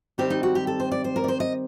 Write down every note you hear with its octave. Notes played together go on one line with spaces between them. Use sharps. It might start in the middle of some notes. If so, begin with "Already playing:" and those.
D#3 G3 C4 D#4 G4
D#4
F#4
G4
A4
C5
D5
C5
A#4
D5
C5
D#5